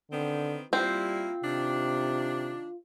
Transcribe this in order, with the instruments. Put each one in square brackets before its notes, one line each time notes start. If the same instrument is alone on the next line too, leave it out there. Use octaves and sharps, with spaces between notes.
[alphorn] D3 [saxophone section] D#3 B3 C4
[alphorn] G3 [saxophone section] A#3 E4 [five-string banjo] C4 [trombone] F4
[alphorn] C3 [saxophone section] D#3 D4